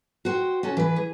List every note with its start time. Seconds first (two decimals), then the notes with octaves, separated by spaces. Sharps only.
0.25 F#4 C5 G5
0.63 C#4 F#4 A4
0.77 E3 B4
0.96 G#4